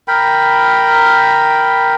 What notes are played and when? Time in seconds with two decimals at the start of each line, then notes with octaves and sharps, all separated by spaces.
0.08 A#4 G5 B5